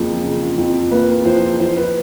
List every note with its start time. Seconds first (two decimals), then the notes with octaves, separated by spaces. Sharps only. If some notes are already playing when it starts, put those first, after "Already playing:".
Already playing: F2 C#3 F3 A#3
0.23 C#3
0.58 F2
0.91 A#3 B4
1.25 F3 C5
1.60 F3 C5
1.77 B4